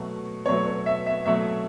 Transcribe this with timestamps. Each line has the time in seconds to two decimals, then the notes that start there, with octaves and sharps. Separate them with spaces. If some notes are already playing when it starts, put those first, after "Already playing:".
Already playing: B2 F#3 A3
0.46 B2 F#3 A3 C#5
0.67 C#5
0.86 E5
1.06 E5
1.26 B2 F#3 A3 E5